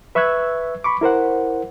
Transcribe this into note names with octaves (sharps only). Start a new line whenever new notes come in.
B4 E5 C#6 E6 F#6 G#6
B5 C#6 D6
E4 A#4 C5 F#5